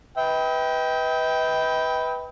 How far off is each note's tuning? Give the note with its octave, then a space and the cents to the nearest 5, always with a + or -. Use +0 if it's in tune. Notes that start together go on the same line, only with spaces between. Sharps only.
B4 +0 D#5 +45 G5 +0